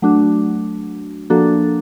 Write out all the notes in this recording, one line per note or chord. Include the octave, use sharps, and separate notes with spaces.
F#3 A3 D4 F#4
F3 A#3 D4 F#4 A4